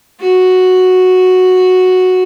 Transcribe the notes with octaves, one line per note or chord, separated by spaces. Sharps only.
F#4